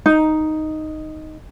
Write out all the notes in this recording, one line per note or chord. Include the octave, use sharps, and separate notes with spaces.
D#4